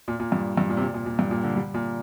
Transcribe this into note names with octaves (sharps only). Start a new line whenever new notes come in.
A#2
A#2
G2
G2
A#2
C3
A#2
A#2
A#2
G2
A#2
D3
G3
A#2